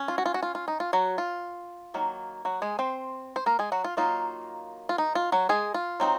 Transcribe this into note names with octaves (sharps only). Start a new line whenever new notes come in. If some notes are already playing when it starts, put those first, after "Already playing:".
Already playing: C#4
F4
F#4
F4
F#4
F4
F4
D#4
F4
F#3 F#4
F4
D#3 F#3 A#3
F#3 F#4
G#3 G#4
C4 C5
C5
A#3 A#4
G#3 G#4
F#3 F#4
F4
D#3 F#3 A#3 D#4 F4
F4
D#4
F4
F#3 F#4
G#3 G#4
F4
F#3 C4 D#4